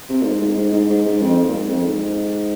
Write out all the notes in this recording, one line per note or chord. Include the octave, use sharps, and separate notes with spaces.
C3
A#2
G#2
G#2
G#2
G#2
G#2
G#2
F2
A#2
G#2
F2
G#2